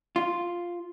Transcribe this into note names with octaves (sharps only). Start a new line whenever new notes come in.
F4